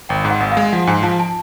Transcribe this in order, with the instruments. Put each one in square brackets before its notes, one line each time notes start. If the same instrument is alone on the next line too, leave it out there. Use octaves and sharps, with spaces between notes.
[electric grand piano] G#1 [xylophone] G5
[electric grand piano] G#2
[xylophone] F#5
[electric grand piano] G#1
[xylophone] F5
[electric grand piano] G#3
[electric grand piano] F3 [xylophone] F#5
[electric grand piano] G#2 [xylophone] G#5
[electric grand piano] F3 [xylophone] A5
[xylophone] A5